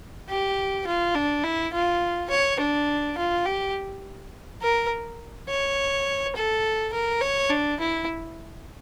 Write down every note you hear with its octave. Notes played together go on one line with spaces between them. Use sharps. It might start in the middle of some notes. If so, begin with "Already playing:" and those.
G4
F4
D4
E4
F4
C#5
D4
F4
G4
A#4
C#5
A4
A#4
C#5
D4
E4